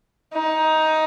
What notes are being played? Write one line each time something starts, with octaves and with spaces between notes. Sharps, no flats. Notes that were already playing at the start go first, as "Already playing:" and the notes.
D#4